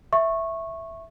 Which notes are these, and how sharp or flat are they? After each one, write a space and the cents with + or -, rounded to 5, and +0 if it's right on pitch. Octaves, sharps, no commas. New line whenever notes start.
E5 +0 C#6 -15